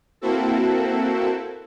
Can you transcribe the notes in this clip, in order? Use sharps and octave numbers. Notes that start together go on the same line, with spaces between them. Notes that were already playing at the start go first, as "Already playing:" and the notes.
A#3 C4 E4 F#4 A4